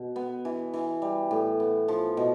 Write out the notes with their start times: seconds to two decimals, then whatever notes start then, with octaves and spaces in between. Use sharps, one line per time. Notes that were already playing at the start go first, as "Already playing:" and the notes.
Already playing: B2
0.16 B3
0.45 E3
0.73 E3
1.02 G3
1.31 A2
1.60 B3
1.88 F3
2.17 B2